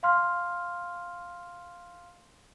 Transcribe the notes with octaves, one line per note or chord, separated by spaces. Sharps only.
F5 C6 F6